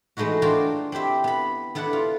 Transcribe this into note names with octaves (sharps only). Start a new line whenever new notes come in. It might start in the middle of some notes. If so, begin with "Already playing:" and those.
E3 G#3 A3 D#4 E4 F#4
D4 F4 F#4 A#4 C5 G5
C4 E4 G4 E5
B3 B5
B3 E4 A4 B4 D5 F#5
F4